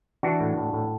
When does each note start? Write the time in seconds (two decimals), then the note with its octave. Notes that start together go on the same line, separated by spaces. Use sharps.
0.23 E3 D4 F#4
0.40 A2
0.58 A2
0.73 A2